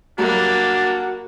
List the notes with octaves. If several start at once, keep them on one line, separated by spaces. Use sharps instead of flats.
F#3 G3 A#3 D4 F#4